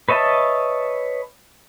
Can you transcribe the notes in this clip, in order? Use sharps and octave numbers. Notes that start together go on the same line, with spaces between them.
B4 C#5 D#5 E5 A5